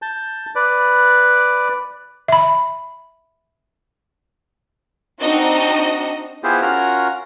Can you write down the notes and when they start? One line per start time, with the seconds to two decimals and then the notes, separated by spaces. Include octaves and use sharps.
0.02 A5 G6
0.55 B4 D5
2.28 E5 B5
5.21 C4 D4 D#4 F#4 D#5
6.44 B3 E4 F4 G4 G#4 C5
6.62 C#4 F4 F#4 A#4 A#5